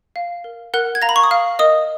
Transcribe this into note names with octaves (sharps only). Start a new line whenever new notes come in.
F5
A#4
A#4 F#5 F#6
G#6
F5 A#5 A#6
B5
C#6
D#6
F5 F6
A#4 D#5 D#6